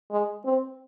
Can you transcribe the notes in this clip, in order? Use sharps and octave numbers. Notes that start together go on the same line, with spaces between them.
G#3
C4